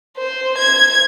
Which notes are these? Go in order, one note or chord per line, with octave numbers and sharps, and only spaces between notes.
C5
G#6